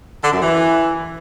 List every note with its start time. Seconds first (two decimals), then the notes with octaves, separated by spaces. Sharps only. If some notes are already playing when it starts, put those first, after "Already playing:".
0.21 D3
0.31 F#2
0.41 E3